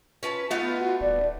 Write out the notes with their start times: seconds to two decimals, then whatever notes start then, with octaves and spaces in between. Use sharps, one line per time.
0.23 C#4 F4 B4 A5
0.51 A3 B3 D#4 F4 F5
0.79 F#4
1.01 D#1 D5